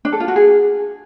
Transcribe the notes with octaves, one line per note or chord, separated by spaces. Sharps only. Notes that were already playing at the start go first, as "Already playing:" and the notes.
D4
A4
F4
F#4
G#4